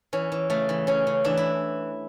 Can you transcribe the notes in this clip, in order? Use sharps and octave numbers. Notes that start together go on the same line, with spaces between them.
E3 C#4
E3
C#3 A3
E3
C#3 C#4
C#3
E3 D4
E4